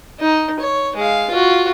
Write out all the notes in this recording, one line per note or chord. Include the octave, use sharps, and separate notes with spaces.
D#4
C#5
G#3 F5
F4 F#4